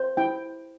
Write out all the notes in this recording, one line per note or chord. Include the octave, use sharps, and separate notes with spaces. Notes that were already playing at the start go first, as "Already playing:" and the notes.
Already playing: C5
E4 G5